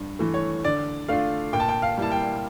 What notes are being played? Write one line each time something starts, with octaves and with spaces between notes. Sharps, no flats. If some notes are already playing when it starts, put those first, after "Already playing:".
Already playing: G2
E3 A3
C#5
D3 D5
A3 D4 F4 F5
A#2 G5
A5
G5
F5
G3 A#3 E4 A5
G5